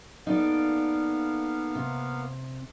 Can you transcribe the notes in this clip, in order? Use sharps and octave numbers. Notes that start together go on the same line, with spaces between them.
A#3 B3 D#4 A4 D5 F5
C3